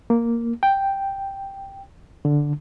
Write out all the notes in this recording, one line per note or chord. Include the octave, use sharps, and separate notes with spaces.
A#3
G5
D3